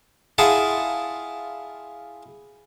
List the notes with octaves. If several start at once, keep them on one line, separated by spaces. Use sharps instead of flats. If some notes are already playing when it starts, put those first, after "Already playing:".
E4 F4 G#4 F#5 A5